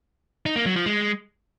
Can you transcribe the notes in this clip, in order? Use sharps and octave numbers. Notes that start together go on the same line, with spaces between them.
D#4
A#3
F#3
F3
G#3